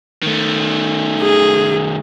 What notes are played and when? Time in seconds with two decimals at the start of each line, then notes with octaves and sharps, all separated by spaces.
0.22 D#3 A3
1.21 G#4